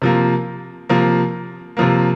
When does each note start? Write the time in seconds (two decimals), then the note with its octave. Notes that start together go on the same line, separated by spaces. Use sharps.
0.02 C3 F3 A#3
0.89 C3 F3 A#3
1.77 C3 F3 A#3